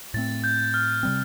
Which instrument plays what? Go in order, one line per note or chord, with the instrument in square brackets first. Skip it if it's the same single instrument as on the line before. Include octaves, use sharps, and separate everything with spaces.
[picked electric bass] A2 A3 C4 [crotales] A6
[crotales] G6
F6
[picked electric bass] C3 G3 C4